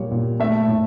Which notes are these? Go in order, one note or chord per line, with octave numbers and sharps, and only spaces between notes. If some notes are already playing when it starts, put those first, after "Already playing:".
Already playing: A#2 G3 A#3 C#5
A#2
A3 E5
A2